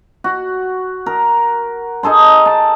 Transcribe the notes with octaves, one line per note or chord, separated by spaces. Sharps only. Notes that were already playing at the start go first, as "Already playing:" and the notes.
F#4
A#4
D#4 G#4 A4 C6
A5